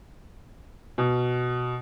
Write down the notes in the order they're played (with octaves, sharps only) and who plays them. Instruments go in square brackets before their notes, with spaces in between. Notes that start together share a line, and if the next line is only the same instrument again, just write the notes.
[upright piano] B2